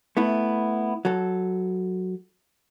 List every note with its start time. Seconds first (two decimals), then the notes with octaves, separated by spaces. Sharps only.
0.17 A3 B3 E4
1.05 F#3 A4